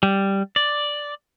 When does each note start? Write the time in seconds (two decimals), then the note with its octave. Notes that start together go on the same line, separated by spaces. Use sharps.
0.03 G3
0.56 D5